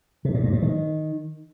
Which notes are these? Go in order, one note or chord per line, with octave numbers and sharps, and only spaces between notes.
C3
A#2
G2
A#2
D#3